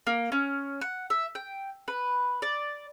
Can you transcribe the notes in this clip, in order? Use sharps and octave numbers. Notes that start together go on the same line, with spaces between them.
A#3
C#4
F#5
E5
G5
B4
D5